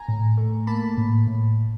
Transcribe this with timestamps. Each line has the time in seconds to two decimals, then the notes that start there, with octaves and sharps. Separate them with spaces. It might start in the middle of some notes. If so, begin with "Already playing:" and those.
Already playing: G#5 A#5
0.08 A2
0.37 A3
0.67 A#3 A5 B5
0.98 A2
1.27 A2